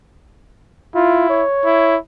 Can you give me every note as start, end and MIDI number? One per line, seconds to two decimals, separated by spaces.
0.95 1.44 64
0.95 1.29 65
1.30 1.96 73
1.65 1.97 64